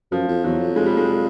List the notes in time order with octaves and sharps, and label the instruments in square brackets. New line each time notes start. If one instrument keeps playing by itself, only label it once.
[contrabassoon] F#2 [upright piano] F3
[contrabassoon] F2
[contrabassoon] E2 [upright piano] F#3
[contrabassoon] F2
[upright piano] G#3
G3
G#3